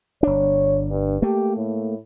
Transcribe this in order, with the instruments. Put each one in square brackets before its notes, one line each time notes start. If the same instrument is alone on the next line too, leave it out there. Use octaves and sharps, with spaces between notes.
[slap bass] G1 D4 [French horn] C#5
[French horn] G2
[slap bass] A3 A#3 [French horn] G4
[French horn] A2